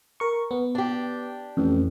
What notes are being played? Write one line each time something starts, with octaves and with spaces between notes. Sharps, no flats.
A#4 C#6
B3
D4 G4
A1 F2